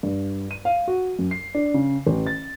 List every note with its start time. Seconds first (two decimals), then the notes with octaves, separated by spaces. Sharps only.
0.03 G2
0.51 D#7
0.65 F5
0.88 F#4
1.19 F#2
1.31 C7
1.55 D4
1.74 C#3
2.07 A1
2.27 A6